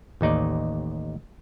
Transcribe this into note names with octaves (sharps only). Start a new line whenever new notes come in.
A1 D#2 D#4 D5